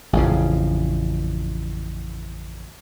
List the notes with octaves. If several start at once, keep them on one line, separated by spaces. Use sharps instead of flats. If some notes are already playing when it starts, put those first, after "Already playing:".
A1 F2 C#3